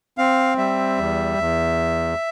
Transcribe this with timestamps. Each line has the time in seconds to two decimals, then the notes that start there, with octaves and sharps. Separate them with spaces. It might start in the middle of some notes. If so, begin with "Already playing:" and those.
0.18 C4 F5
0.58 G3 E5
0.98 E2
1.38 E2